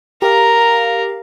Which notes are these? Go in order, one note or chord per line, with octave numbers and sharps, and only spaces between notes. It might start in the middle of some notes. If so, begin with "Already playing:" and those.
G4 A#4 F5 A#5